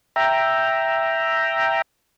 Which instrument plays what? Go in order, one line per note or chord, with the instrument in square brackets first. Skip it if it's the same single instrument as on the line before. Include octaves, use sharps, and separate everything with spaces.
[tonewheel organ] E5 G5 A#5